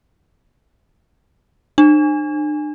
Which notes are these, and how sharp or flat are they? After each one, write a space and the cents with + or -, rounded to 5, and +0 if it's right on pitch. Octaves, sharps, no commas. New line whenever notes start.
D4 +40